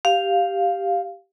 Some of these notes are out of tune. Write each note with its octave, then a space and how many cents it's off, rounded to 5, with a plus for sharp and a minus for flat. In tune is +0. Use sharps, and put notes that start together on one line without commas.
G4 +0 F5 +0